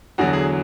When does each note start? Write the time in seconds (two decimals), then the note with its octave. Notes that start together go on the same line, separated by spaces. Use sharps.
0.18 E2 D3 F#3 F#4
0.33 G#4